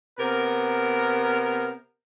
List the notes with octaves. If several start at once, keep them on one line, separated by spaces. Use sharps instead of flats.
C3 B3 A#4